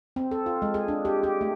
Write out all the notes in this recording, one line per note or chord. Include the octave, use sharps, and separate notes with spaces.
C4
A4
F4
G#3
G#4
D4
G4
G4
A3